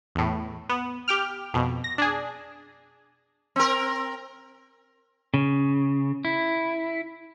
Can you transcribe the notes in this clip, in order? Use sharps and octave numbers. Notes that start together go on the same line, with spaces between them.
E2 A2
B3
G4 G5 F6
F2 B2
A#6
D4 G#4
C4 A#4
C#3
E4